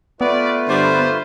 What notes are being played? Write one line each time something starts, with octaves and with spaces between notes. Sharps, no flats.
A3 B3 F4 B4 D5
G2 D3 G3 C5